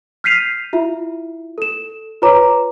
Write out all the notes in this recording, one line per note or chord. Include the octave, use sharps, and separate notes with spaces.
F6 G6 B6 C7 D#7 F7
E4 F4 E5
A4 E7
F4 B4 C#5 A#5 D6